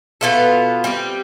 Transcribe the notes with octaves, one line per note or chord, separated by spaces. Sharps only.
B2 B3 F4 A4
G3 C4 G4